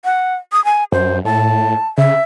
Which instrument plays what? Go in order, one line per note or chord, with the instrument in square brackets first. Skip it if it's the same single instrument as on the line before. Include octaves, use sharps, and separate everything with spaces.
[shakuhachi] F#5
D#6
G#5
[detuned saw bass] F#2 [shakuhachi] C5
[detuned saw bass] A2 [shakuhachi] A5
[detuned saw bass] C#3 [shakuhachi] E5